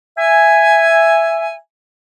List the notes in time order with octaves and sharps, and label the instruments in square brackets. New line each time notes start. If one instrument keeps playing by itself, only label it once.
[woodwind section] E5 G#5